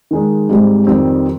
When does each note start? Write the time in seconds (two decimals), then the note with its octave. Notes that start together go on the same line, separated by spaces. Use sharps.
0.11 D#3 G#3 D#4
0.49 G#2 G3 C4 G4
0.87 F2 D#3 G3 C4